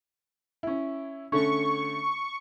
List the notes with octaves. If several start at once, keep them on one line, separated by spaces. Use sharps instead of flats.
C#4 E4
D3 A3 C#4 C#6